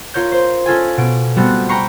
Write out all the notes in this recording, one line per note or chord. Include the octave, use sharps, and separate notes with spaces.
F4 A#4 C#5 G6
C5
C#4 F4 A4 G#5
B2 D7
G3 A3 B3 C4 F#4
G5 A#5 B5 C#6 C7 C#7